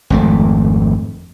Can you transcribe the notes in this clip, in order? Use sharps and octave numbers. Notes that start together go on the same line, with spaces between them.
G#1 F2 A3